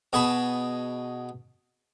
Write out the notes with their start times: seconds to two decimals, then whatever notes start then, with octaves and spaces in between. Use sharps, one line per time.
0.13 B2 G#4 A5 B5